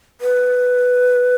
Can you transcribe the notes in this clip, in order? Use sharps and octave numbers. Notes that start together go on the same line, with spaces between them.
B4